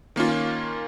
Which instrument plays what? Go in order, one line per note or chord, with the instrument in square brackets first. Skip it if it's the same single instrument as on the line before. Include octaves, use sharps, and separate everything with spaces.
[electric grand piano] D#3 A#3 C#4 F4